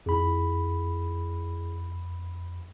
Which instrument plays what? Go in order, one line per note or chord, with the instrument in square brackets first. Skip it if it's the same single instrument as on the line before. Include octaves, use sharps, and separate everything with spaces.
[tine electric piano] F2 B5 [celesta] E4 G#4